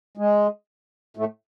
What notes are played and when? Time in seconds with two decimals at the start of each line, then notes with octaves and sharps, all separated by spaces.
0.17 G#3
1.17 A2 A3